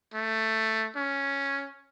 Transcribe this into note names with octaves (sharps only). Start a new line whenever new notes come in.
A3
C#4